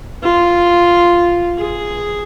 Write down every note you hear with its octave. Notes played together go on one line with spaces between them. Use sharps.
F4
G#4